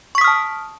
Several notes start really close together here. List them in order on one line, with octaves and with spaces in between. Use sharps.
C#6 B6 D#6 F6 A5